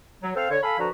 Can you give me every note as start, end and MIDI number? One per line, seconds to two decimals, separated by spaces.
0.23 0.32 54
0.36 0.48 60
0.36 0.48 69
0.36 0.48 72
0.36 0.48 77
0.50 0.58 50
0.50 0.58 73
0.62 0.76 69
0.62 0.76 77
0.62 0.76 80
0.62 0.76 83
0.79 0.88 50
0.79 0.88 53
0.79 0.88 66
0.79 0.88 71
0.79 0.88 82